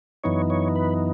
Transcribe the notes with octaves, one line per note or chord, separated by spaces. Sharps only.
F#2 E3 B3 D#4 C#5
C#5
B4